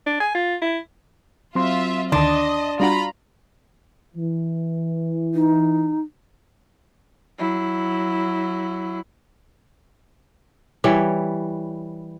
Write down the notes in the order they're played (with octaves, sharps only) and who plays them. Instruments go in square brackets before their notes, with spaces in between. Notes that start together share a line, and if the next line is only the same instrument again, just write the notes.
[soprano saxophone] D4
G#5
F4
E4
[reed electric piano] F#3 C4 C6 [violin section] F4 E5
[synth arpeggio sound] D2 D3 D#3 [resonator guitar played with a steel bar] D4 [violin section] D#5 [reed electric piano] A5 C6
[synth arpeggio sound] G3 D4 F#4 [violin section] F4 A#5 B5
[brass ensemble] E3
[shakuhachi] D#4
[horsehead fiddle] F#3 E4
[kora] E3 G3 C#5